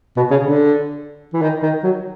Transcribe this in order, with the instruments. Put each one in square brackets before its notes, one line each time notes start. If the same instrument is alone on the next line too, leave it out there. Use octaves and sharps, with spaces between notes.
[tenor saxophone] B2
C#3
D3
E3
D#3
D#3
F#3